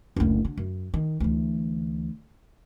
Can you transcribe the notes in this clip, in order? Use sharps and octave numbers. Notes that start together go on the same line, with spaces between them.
F#1 D2
D3
F#2
D#3
D2 E3